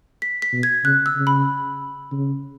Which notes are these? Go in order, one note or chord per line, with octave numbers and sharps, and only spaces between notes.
B6
B6
B2
G#6
C#3 F#6
E6
C#3
B5
C#3